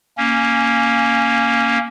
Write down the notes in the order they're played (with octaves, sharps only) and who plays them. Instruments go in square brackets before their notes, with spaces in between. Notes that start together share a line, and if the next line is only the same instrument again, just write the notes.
[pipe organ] A#3 C#4